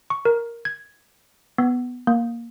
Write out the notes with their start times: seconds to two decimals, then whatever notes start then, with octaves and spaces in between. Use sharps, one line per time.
0.10 C#6
0.25 A#4
0.65 G#6
1.58 B3
2.07 A#3